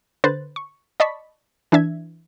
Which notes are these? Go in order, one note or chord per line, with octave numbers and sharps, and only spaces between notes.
D3 B4 C5 F#6 A6
C#6
D5 D#5 A5 B5 C#6 B6
E3 D4 E5 G#6